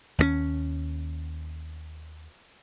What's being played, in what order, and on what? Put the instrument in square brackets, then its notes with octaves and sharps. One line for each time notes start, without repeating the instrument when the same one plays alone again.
[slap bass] D#2 G#3 C#4